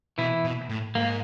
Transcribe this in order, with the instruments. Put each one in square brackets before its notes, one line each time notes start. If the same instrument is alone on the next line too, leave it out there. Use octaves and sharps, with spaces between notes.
[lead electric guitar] B2 [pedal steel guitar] E3 E4
[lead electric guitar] B2
A2
[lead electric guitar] G#2 [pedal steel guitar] A#3